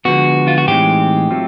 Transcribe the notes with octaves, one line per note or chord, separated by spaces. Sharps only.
D3 F3 G#3 B3 F#4
F4
F#4
A2 E3 G#3 C4 D#4 G4
F#3 A3 C4 F4